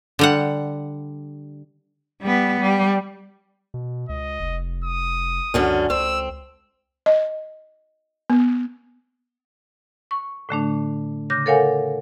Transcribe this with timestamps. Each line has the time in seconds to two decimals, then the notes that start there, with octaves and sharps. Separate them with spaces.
0.19 D3 G3 F#5
2.21 G3 B3
2.61 G3
3.74 B2
4.09 C#2 D#5
4.40 F1
4.85 D#6
5.54 C#2 F#2 D3 C#4
5.90 C#2 C4 E6
7.06 D#5
8.30 B3
10.11 C#6
10.49 A2 D3 A3 D4
11.30 C#3 D6 G6 A#6
11.46 A4 A#4 C#5 F5 F#5 G#5